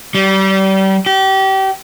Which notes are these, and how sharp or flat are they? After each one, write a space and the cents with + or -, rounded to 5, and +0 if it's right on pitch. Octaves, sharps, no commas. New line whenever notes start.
G3 -30
G4 -30